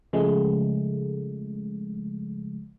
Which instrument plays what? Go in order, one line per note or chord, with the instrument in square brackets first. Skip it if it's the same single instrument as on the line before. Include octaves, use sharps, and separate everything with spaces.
[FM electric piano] C#3 F3 G#3 A3